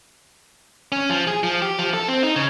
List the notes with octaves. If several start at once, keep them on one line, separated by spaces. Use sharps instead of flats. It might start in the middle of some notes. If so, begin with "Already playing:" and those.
C#4
F3
G#4
F3
G4
F3
A4
C4
D#4
C#3